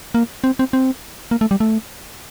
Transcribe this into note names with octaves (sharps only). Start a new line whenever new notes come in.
A#3
C4
C4
C4
A#3
A3
G3
A3